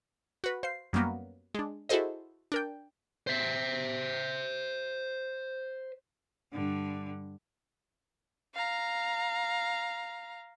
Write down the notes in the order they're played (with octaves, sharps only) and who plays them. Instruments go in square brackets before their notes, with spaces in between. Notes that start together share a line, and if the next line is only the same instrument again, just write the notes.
[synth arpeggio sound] F#4 B4
C5 F5 C7
F#2 F#3 G3 A#3 B3
G#3 D4
E4 F#4 G#4 A4 C5 D#5
D4 A#4 G5
[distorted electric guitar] C5 E5
[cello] G2 D3
[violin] F5 A#5